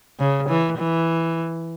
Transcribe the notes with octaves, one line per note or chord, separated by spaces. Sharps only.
C#3
E3
E3